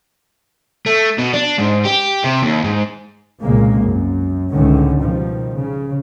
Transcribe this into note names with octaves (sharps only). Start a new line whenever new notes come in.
A3
B2
D4
G#2
G4
C3
D#2
G#2
C2 A#2 C#3 G#3 A#3
F#2
C#2 A2 D3 D#3 C#4
B2 D#3 F3 G3
C#3